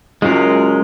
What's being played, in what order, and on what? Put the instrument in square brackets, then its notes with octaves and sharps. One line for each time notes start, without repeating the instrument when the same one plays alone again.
[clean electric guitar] C#3 F#3 F4 [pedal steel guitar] G#3 A#4